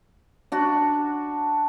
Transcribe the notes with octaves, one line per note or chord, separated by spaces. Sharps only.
D4 F#4